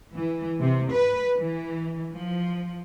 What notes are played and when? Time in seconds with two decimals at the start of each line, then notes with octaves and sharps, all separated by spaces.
0.13 E3
0.60 C3
0.91 B4
1.37 E3
2.12 F3